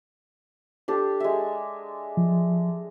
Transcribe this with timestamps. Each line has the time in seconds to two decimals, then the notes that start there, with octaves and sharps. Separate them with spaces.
0.88 D4 G4 A4
1.20 G#3 E5
2.17 F3